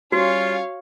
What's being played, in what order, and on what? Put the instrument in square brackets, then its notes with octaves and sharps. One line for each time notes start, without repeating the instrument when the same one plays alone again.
[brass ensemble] G3 C#4 [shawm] F4 [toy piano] F#4 [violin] C#5 F5